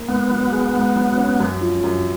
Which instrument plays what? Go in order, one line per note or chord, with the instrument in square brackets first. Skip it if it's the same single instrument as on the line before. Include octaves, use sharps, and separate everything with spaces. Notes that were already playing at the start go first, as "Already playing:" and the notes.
Already playing: [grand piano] A#3
[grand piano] G#2 [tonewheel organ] B3
[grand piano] F#3
G#4
G#2
F#3
C#4
F#2
F3
F#2